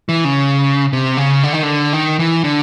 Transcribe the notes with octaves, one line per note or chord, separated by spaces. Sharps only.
E3
C#3
C3
C#3
D3
D#3
D3
D#3
E3
D3